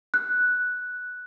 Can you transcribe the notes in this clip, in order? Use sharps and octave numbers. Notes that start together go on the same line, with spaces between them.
F#6